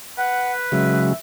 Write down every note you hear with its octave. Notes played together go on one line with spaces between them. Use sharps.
B4 F#5
C#3 F#3 G#3 E5